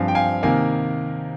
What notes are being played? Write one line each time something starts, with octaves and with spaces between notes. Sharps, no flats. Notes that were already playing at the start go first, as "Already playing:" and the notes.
Already playing: G2 F3 C4 F5 G#5
G5
F5 G#5
C3 D#3 A#3 F5 G#5